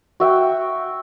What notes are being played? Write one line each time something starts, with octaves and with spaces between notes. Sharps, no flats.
F#4 E5 G5